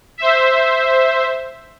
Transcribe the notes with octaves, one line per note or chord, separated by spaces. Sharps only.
C5 E5